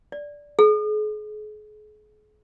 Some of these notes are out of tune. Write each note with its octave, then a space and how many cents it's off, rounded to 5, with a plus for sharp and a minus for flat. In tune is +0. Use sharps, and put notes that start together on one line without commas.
D5 -5
G#4 +40